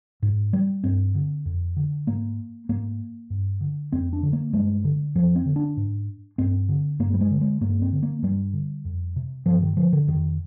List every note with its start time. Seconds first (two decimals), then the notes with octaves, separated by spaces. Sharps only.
0.22 G#2
0.53 G3
0.84 G2 C4
1.15 D3
1.46 F2
1.77 D3
2.07 G#2 A#3
2.69 G#2 A#3
3.30 G2
3.61 D3
3.92 F2 C4
4.13 D4
4.23 D3
4.33 A#3
4.53 G2 G#3
4.84 D3
5.15 F2 F3
5.36 C4
5.46 D3
5.56 D4
5.77 G#2
6.38 G2 C4
6.69 D3
6.99 G2 A#3
7.14 G3
7.21 G#3
7.31 D3
7.41 G#3
7.61 G2 A#3
7.82 C4
7.92 D3
8.03 A#3
8.23 G2 G3
8.53 D3
8.85 F2
9.16 C3
9.46 G2 F3
9.62 D#3
9.77 D3 F3
9.93 D3
10.08 F2 D#3